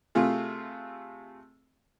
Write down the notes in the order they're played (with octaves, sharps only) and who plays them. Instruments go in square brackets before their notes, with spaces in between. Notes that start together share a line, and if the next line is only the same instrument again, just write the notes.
[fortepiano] C3 A3 F4 G#4